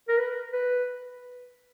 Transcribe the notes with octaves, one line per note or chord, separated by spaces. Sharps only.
A#4
B4
B4